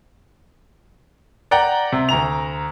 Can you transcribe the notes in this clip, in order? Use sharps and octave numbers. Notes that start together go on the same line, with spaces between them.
D5 F#5 G5 A#5
C3
D2 A#5 F7